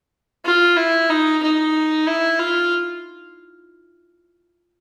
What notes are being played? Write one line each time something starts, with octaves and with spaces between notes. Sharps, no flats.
F4
E4
D#4
D#4
E4
F4